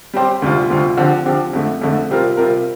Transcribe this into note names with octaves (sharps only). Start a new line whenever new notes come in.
G3 C4 G4 C5
D2 C3 G3 C4 F4
D2 C3 G3 C4 F4
D3 F3 C4 G4
D3 F3 C4 G4
F2 D3 A3
F2 D3 A3
C3 G3 C4 F4 A#4
C3 G3 C4 F4 A#4